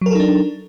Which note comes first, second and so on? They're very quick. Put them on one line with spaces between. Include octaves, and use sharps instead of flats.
F#3 A#4 A4 D#4 D4